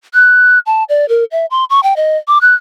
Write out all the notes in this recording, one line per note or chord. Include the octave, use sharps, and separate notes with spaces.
F#6
A5
D5
A#4
E5
C6
C#6
G5
D#5
D6
F#6